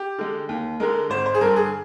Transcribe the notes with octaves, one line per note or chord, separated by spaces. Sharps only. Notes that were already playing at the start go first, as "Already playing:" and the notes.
Already playing: G4
D3 G#3
D#2
D3 G#3 A#4
G#1 C5
C5
G#4
G2 D3 A#4
G#4